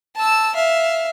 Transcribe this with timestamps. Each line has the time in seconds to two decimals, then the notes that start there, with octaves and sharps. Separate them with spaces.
0.16 A5 E6
0.55 E5 F5